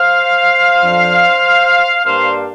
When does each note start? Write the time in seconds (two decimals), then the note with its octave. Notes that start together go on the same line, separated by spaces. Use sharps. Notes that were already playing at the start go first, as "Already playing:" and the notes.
Already playing: C5 F5
0.82 F2 F3 D4
2.04 G2 G3 A#3 D4 C5 F5